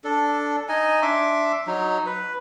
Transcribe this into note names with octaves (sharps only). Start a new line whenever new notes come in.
D4 A4
D#4 D#5 G#5
D4 E5 C6 D6
F#3 D#4
B4